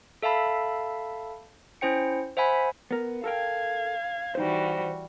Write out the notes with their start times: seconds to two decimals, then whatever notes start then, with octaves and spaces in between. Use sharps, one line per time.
0.22 A4 E5 F5 A5 B5
1.81 C#4 E4 C5 G5 C#7
2.37 C5 E5 F#5 G#5 B5
2.91 B3 A#4
3.24 A4 A#4 F5 G5 G#6
4.35 E3 G3 D#4 F#4 C5